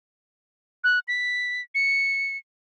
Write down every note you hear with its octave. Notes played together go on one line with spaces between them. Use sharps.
F#6
B6
C#7